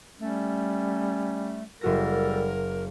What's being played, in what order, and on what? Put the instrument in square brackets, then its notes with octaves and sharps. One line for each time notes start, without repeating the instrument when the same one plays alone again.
[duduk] G3 [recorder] A3 [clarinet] C#4
[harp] F#1 F#4 A#6 [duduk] G3 [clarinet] A4 [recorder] A#4